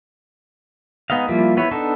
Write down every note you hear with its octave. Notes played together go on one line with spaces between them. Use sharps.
G#3 B3 D#4 D#5 F5
F3 G3 A#3 E4 F4
B3 E4 B4 C#5
B3 D4 D#4 A4